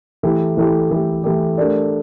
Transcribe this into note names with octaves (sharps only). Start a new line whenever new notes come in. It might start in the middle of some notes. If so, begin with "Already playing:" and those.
E3 A3 E4 G4
E3 A3 E4 G4
E3 A3 E4 G4
E3 A3 E4 G4
A3 D4 G4 A#4 D5